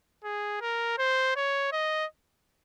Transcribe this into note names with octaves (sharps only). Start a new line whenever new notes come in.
G#4
A#4
C5
C#5
D#5